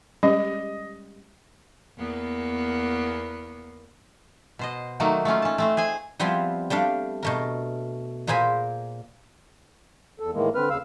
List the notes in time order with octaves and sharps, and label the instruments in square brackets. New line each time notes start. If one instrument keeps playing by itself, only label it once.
[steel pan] G3 G#3 [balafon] C#4 [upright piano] D#5
[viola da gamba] E2 A#3 B3
[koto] B2 C5 D#5
D#3 F#3 A3 A#3 D#4
A3 A#3 C#4 F4
C#4 A5
A3 C4 C5
G#4 C5 G#5
[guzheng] F3 G3 B3 C4 E4 F4
G3 A3 D4 F5
B2 A3 A#4
A#2 A#3 G#4 C5 G#5 B5
[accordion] E2 A4
A2 D#3 E3 G#3 A#3
D3 C4 B4 F6
D#2 C#3 F5 E6